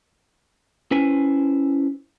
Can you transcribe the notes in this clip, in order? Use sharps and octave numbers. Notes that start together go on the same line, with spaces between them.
C#4 E4 B4 C5 G#5